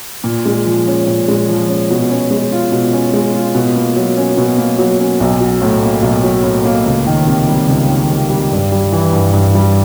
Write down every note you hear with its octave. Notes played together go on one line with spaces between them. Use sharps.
A#2
G#3
F3
C#4
A#2
G#3
F3
C#4
B2
C#4
G#3
F4
B2
C#4
G#3
F4
B2
A#3
F#3
C#4
B2
A#3
F#3
C#4
B1
F#3
A2
A#3
B1
F#3
A2
A#3
C#2
D#3
C3
G3
C#2
D#3
C3
G3
G2
G3
E3
G2
G2
G3